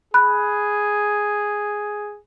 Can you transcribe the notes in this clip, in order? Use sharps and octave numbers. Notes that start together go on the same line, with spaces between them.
G#4 B5 F#6